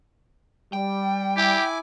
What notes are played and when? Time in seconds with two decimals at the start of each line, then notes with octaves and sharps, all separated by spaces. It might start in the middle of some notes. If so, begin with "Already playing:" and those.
0.73 G3 G5
1.37 E4 G4 G#5 D6